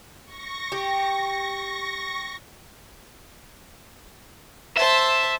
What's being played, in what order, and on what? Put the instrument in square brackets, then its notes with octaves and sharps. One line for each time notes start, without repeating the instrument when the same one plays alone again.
[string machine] C#6 A#6
[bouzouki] G4
[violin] C5 A5 [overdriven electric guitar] E5